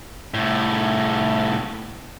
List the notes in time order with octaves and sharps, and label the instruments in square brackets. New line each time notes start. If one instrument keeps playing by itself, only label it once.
[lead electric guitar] C2 A2